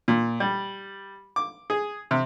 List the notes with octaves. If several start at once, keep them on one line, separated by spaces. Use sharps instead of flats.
A#2
G3
D6
G#4
C3